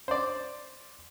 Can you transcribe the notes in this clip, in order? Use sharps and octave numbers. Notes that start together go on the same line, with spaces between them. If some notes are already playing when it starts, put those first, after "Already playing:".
C5 D5